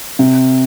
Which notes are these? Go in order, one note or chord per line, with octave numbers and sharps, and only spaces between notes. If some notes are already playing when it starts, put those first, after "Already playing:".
C3